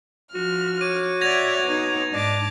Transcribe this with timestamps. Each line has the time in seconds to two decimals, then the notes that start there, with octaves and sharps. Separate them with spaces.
0.34 F3 F#4 F6
0.81 C#5 D6 D#7
1.21 D5 E5 F#5 G#6 A#6 F7
1.65 B2 D#4
2.12 G#2 D4 D#5 A5 D6